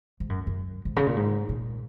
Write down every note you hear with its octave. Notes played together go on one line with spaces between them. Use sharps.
G#2
F#2
F#2
G#2
C#3
A#2
G#2
A#2